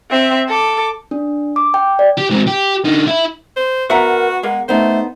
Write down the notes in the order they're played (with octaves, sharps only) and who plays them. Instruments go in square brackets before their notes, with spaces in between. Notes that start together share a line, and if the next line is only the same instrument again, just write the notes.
[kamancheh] C4 E5
A4 D6
[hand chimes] D4
D6
G5
D5
[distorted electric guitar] G4
G#2 C4
G4
D3 D#4
E4 E5
[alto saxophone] C5
[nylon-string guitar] B3 [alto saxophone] F#4 [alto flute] A#4 [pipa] E5 F#5 A#5
[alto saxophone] G#3 [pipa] A#3 [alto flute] F#5
[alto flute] A3 [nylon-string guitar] B3 D#4 [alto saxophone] C5